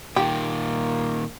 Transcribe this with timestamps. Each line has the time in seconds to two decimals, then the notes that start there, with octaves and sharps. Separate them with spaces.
0.16 A#2 D#3 A#3 G4